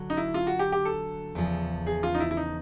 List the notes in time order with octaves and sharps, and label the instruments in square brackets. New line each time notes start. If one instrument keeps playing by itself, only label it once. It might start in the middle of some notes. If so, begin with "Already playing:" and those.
Already playing: [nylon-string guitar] D3 F#3
[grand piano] D#4
E4
F4
F#4
G4
G4
A4
[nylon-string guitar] E2 C#3 F3
[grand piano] G#4
F4
D#4
E4
E4
D#4